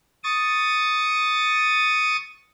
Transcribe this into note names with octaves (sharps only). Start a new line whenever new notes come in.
C#6 D#6 A6